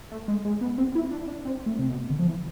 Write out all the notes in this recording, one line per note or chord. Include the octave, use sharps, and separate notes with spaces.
A3
G#3
G#3
B3
C4
E4
D4
D4
C4
A3
C3
B2
D3
F3
E3